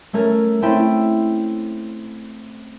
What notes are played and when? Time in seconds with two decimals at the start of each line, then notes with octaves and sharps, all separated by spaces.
0.13 A3 C#4 A#4 G#6
0.62 A3 C4 C#4 E4 G5